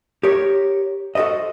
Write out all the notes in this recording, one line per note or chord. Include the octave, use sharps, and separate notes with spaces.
G4 A#4 C#5
F#4 A4 A#4 C5 D#5